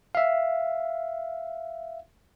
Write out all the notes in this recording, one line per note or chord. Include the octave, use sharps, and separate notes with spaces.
E5 F5